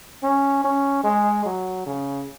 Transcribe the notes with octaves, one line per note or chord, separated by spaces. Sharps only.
C#4
C#4
G#3
F#3
C#3